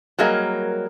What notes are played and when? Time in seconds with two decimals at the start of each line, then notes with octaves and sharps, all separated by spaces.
0.19 F#3 G3 A#3 G#4 A#4 D#5